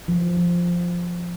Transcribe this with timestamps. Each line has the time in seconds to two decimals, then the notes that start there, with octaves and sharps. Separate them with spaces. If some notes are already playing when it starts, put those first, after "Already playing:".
0.08 F3
0.37 F3